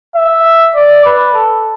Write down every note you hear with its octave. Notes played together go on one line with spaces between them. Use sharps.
E5
D5
B4
A4